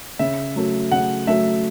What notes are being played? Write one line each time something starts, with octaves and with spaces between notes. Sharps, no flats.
C#3 E5
F#3 A3
C#3 F#5
F#3 A3 E5